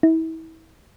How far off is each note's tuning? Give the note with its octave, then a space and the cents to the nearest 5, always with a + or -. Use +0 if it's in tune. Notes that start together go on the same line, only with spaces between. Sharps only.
E4 -35